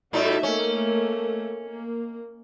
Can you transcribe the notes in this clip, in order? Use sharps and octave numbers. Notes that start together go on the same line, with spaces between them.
A2 G3 D#4 F#4 A4 E5
A3 A#3 C#4
A#3